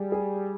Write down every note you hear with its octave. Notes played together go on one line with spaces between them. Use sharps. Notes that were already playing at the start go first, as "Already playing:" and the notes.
Already playing: G3 G#4
G#4